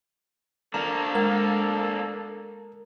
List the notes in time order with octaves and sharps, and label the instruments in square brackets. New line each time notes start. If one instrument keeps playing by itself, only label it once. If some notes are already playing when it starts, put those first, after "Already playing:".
[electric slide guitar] A#3 D4 [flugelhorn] A4 [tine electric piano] A#5
[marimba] G#3 [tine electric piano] A#4